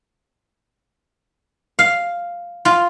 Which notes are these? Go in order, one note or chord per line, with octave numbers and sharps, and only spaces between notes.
F5
F4